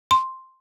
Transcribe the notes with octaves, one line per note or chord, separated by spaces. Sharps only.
C6